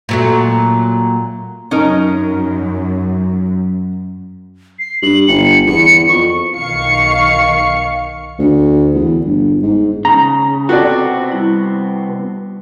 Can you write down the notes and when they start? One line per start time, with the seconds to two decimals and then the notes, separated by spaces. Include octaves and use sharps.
0.09 A#2 F#3 A3
1.71 F#2 C#4 D#4 A#4
4.79 C7
5.02 G2 F#7
5.28 G1 C#7
5.67 E2 C#7
6.09 F2 C#6
6.57 B1 D#3 F5 C#6 C7 C#7
8.39 D2
8.94 E2
9.25 G1
9.62 G#2
10.05 C#3 A#5
10.69 C3 B3 C4 F#4 A4 D5
11.32 G3 E4